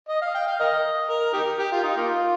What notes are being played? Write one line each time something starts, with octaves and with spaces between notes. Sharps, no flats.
D#5
F5
G5
F5
A#4 D#5
A#4
D#4 G4 A#4
G4
F4
D#4
A#3 F4